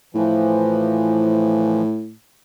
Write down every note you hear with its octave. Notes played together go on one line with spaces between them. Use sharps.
A2 E3 F3